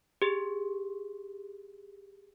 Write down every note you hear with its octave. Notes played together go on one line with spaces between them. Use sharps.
G4 G#4